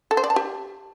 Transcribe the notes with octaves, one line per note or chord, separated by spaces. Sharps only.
A4
C5
D5
A5
G4